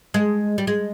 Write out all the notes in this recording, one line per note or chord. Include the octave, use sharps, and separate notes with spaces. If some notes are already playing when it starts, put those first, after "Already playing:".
G#3
G3
G#3